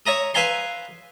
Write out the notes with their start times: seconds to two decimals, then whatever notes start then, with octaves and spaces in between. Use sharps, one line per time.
0.06 C#5 E5 A#5 D#6
0.34 B4 E5 F5 G#5 A#5 C6